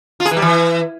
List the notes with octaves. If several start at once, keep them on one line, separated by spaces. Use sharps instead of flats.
F4
G#4
E3
G3
E3